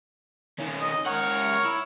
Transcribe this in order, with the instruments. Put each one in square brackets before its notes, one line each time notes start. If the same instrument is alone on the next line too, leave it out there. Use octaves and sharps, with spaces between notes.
[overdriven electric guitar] D#3 C#4
[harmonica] D#5
[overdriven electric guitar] C#2 F#5 [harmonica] A#4 C#5 C#6
[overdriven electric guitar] E4